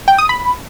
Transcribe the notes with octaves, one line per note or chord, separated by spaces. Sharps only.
G5
D#6
B5